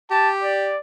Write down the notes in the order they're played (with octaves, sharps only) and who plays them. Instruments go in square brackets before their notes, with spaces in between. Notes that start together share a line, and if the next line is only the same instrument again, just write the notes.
[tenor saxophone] G4 [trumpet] A5
[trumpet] D5